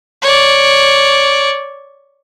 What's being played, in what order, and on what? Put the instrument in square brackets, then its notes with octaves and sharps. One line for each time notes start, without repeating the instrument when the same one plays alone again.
[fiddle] C#5 D5